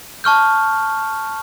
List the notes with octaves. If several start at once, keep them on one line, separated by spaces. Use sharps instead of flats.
A5 C#6 F6 G6